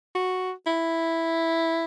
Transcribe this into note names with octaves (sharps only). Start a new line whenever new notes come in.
F#4
E4